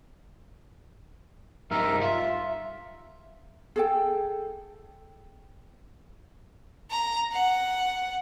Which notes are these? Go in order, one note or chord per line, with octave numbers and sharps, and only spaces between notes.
G2 G3 D#4 A#4 E5
F4 E5
G#4 A4 G5
A#5
F#5